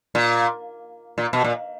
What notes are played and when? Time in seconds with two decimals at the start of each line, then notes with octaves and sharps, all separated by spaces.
0.15 A#2
1.18 A#2
1.33 B2
1.44 A#2